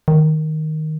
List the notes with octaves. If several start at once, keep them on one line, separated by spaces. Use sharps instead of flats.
D#3